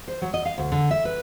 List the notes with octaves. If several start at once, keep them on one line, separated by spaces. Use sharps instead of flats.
C5
F#3
D#5
F5
D2
D3
E5
B4